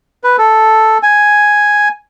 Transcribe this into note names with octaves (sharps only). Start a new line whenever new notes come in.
B4
A4
G#5